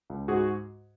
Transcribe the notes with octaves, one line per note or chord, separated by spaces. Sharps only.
C#2
G#2 F#4 G#4